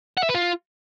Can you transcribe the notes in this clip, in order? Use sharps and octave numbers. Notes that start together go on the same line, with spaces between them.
F#5
E5
B4
F4